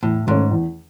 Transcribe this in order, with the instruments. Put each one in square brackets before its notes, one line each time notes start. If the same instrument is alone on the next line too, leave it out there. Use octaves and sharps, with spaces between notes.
[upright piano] E2 [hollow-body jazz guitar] A2
[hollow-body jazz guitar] G#2 [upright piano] D#3 A3 C#4
[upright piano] E2